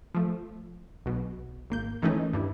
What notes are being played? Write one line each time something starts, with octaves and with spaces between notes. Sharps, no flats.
F3 A3
B1 B2
G#1 A#3 G6
D#3 E3 A3 C#4 D#4
G2 G3 E4